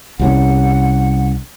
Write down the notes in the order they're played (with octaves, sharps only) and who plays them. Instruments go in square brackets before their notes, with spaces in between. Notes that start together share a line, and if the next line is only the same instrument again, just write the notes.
[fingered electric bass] C2 F3 C#4 [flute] F#5